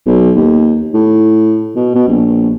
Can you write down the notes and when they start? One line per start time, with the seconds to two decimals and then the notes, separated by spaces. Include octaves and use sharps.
0.06 B1
0.36 D#2
0.94 A2
1.75 B2
1.95 B2
2.08 A#1